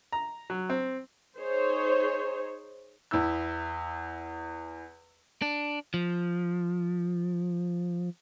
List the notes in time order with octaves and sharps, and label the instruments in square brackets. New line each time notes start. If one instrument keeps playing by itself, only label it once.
[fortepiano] A#5
F#3
C4
[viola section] D#4 G#4 C5 C#5
[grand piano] E2 E4 E6
[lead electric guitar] D4
F3